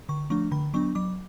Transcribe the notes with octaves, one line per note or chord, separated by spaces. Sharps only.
D3 C#6
F3 A3 D4 C#6
D3 B5
F#3 B3 D4 C#6
F#3 D6